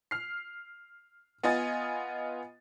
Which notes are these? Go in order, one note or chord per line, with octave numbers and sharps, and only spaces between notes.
F6 C7
B3 F4 D#5 G#5 A6